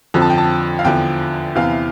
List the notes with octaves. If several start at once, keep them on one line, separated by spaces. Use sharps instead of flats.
F2 D3 F3
A5
G5
A5
F5
E2 D3 F3 G5
E2 C3 E3 F5